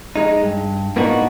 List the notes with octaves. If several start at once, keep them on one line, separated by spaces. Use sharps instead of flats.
G#3 D#4
G2
A2 A#3 B3 D4 D#4 F#4